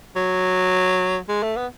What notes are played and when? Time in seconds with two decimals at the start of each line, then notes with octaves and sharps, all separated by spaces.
0.16 F#3
1.28 G#3
1.43 A3
1.57 B3